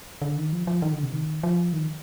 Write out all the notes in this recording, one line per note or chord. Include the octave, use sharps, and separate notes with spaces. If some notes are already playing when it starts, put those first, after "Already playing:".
D3
D#3
F3
F3
D#3
D3
C3
D#3
F3
D#3